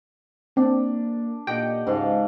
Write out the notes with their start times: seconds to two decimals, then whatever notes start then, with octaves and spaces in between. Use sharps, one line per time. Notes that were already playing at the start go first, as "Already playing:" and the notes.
0.57 A#3 C4 D4
1.47 A#2 G4 D#5 F#5 G5
1.87 C#2 G#2 F5 A5